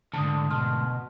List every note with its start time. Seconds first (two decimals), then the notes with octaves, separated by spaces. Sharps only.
0.13 D2 G#2 D3 A5 D#6
0.51 B2 A5 C6 F6